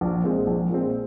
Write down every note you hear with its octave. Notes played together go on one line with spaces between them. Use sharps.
A#1
A#2 G#3 C4
A#1
A#2 G#3 C4